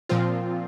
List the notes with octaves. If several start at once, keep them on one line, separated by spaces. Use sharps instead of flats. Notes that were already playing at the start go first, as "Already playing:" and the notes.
A#2 F3 C4 F4